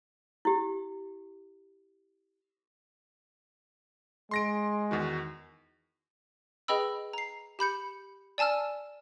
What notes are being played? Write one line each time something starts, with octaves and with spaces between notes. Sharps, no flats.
E4 G4
G#3 C6 A#6 D7
E2 D#3 F#4
G#4 B4 D#5 G5 B5 E6
A#5 C7
G4 B5 G6 C#7
D5 G#5 A5 E6 F6